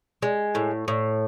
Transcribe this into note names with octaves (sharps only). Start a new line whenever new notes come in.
G#3
A2
A2